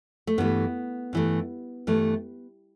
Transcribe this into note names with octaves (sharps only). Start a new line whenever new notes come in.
A3
G2 E3 A3 B3
G2 E3 A3
G2 E3 A3